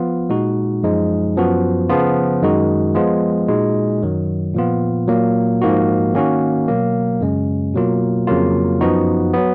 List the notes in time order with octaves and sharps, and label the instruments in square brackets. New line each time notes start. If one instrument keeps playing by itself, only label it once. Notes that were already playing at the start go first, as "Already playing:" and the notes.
Already playing: [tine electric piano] F3 B3 F4
A#2 G#3 D#4 F#4
F#2 F3 G#3 D#4
F#2 F3 B3 F#4
C#3 F3 B3 F4
F#2 D#3 G#3 D#4 F#4
F3 G#3 B3 F4
A#2 G#3 D#4 F#4
F#2 D#3 F#3
A#2 F3 B3 F4
A#2 F#3 A#3
G#2 F3 A#3 D#4 F#4
D#3 A#3 C#4 F#4
B2 F#3 A#3
F#2 C#3 G#3 C#4
B2 F#3 A#3 F4
F2 C#3 F#3 A#3 F4
F#2 F3 B3 D#4 F#4
F#3 B3